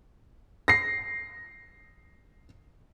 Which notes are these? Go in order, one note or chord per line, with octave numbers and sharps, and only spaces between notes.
A#6 C7